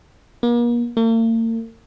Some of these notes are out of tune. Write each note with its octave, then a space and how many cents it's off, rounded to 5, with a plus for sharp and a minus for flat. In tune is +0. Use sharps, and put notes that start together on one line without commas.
A#3 +40
A#3 -45